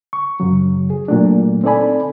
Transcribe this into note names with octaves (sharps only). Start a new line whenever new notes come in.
C#6
F#2 C#3 F#3
G#4
A#2 F#3 A3 D4
C4 D#4 A4 D5 G#5 B5